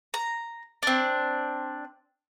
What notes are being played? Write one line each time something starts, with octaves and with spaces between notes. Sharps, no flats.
A#5
C4 D4